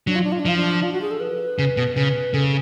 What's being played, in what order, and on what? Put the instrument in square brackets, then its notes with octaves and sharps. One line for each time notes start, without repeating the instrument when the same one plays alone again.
[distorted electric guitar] F#3 [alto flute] D4
[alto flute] F4
D4
F4
D4
[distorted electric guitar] F3 [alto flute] F4
[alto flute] D4
F4
F#4
G#4
A4
B4
[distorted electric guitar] C#3
B2
[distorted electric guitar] C#3 [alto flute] B4
[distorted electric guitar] C#3 [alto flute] A4